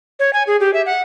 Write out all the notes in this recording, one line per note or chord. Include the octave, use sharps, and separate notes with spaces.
C#5
G#5
G#4
G4
E5
F#5